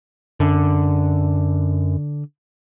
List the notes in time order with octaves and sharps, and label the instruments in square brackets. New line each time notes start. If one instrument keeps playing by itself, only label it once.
[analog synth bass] F#2 [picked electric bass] D3